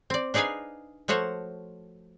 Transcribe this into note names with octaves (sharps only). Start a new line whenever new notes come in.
C4 D5
D4 D#4 G#4 B4 F5 G#5
F3 A3 F#4 C5 C#5